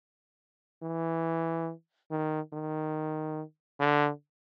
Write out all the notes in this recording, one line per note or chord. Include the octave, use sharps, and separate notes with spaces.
E3
D#3
D#3
D3